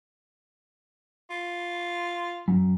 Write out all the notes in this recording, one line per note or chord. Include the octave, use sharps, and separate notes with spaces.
F4
F#2